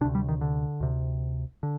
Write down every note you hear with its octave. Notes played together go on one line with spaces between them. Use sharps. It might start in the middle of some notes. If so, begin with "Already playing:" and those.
D2 C3 D4
G3
D#3
D3
D2 C3
D3